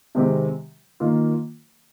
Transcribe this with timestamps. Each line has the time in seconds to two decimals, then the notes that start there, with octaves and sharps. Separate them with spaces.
0.15 C3 D#3 G#3 C4 G4
1.00 D#3 A#3 F4